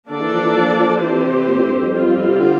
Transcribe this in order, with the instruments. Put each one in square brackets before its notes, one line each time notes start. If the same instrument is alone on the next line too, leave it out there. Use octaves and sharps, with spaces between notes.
[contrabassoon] D3 [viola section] A#3 D4 A4 D5
[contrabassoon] E3
F3
E3
F3
F3
[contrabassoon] E3 [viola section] C4 G4 C5
[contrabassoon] C3
A#2
A2
G2
F2
[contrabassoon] F2 [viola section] G3 C4 F4
[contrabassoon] F2
F2
C3
D3